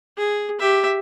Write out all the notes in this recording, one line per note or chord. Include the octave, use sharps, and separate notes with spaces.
G#4
G4 E5